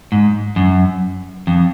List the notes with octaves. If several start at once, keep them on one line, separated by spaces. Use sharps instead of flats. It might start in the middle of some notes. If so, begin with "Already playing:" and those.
G#2
F#2
F2